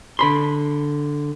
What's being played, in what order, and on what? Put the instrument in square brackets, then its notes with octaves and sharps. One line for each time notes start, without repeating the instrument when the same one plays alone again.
[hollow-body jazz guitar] D3 B5 C6